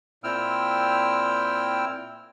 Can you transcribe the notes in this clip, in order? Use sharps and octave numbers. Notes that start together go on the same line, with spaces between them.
A#2 C4 E4 G5 E6 F6